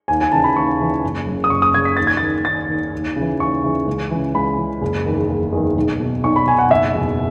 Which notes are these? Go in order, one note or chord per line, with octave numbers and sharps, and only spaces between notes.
D#2 G#5
G#5
C#3 E3 A5
B5
D#2 C#6
C#3 E3
F#1
F#2 C#3
D#6
F#1 C#6
D#6
F#2 C#3 G#6
B6
D#2 A6
G#6
A6
D#3
D#2 A6
D#3
D#2
C#3
E3
D#2 C#6
C#3 E3
C#2
C#3 E3
C#2 B5
C#3 E3
F#1
E2 D#3
F#1
E2 D#3
B1
B2
B1 C#6
B5
B2 G#5
F#5
F#1 E5
E2 B2